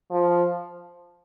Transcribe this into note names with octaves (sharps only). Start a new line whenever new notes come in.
F3